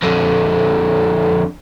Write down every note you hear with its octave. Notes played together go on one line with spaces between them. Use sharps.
F2 D3